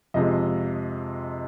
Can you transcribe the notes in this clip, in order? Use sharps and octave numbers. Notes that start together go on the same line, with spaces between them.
F2 C3 F3 G#3 D#5